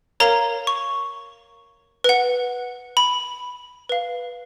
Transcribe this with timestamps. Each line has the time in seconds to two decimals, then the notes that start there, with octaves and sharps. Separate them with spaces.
0.20 A#4 C#5 F5 A#5
0.67 C#6
2.04 B4 F#5
2.97 B5
3.89 B4 F5